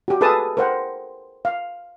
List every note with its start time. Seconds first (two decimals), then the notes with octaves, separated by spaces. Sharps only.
0.08 F#4 G4
0.21 G#4 A4 B4 A5 D#6
0.57 A#4 C5 F#5 G5
1.45 F5